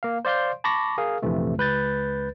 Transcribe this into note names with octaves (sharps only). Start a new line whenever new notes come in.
A#3 F5
C5 D5 F5 C6 G6
A5 B5 C#6 D6 A#6
G#4 A#4 F5
A#1 F2 C3 E3 A3
C#2 B4 G6 A6